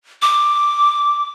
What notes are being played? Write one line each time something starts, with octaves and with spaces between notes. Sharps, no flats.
D6